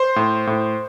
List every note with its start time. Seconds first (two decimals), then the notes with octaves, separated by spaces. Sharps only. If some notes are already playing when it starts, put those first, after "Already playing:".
Already playing: C5 C6
0.16 A2
0.47 A2